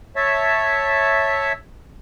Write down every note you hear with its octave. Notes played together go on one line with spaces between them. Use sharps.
C#5 E5 A5